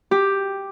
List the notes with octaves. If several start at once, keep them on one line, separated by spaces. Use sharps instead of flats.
G4